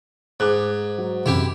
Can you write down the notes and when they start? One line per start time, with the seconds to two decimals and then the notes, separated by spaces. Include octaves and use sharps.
0.40 G#2 D6 F#6
0.98 F#3
1.26 F#2 C3 E4 G4